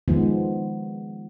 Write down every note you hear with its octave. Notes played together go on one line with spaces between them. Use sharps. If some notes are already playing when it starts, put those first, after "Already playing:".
D#3 F3 G#3 B3